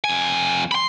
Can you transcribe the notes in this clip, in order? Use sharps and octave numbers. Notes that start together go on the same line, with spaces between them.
F2 G#5
B5 C6